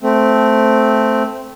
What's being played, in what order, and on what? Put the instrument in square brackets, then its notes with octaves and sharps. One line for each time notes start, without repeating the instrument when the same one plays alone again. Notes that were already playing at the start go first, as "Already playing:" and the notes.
[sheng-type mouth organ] A3 C4